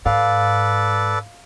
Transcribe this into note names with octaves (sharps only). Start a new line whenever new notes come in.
G#2 A4 B4 D5 F5